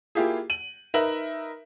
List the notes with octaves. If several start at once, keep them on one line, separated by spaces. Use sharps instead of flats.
A#3 E4 F4 G4 G#4
D#7 F#7
D#4 A#4 B4 E5 F#7